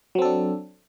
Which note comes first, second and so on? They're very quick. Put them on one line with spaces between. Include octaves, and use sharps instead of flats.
F#3 C4 A4 D4